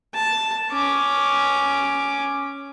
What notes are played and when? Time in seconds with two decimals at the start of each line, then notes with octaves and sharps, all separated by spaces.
0.15 A5
0.71 C#4 D6